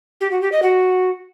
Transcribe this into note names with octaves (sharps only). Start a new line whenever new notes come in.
G4
F#4
G4
D#5
F#4